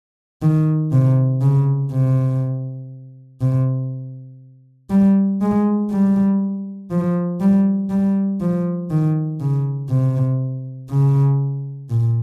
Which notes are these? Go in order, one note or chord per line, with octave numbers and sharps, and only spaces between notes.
D#3
C3
C#3
C3
C3
G3
G#3
G3
F3
G3
G3
F3
D#3
C#3
C3
C#3
A#2